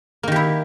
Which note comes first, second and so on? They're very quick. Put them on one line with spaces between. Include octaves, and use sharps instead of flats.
A#3 D#3 G4 E4